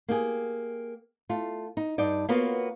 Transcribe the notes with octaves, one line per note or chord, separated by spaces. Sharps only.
A#3 G4 G#4
A3 F4
D#4
G2 D#4 D5
A#3 B3 F4 F#4 B4 C#5